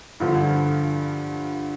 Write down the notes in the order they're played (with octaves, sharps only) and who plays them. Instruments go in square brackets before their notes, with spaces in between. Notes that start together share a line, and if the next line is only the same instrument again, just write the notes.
[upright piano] G2 D3 F3